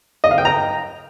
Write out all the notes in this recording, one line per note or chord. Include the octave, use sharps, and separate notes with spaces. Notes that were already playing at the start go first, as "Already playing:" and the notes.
D#5
F5
G5
A#5